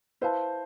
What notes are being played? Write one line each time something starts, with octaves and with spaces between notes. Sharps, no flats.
E4 B4 C5 F5 A5